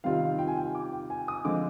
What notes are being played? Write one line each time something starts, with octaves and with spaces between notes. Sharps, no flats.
C3 D#3 G3 C4 F4 F5
G5
G#5
G5
D6
G5
G#5
D#6
D3 F3 G#3 C4 F4 D6